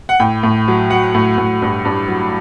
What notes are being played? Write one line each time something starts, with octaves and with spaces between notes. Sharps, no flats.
F#5
A2 G5
A2
F#3
F#3 F#5
A2
A2
G2
G2
F#3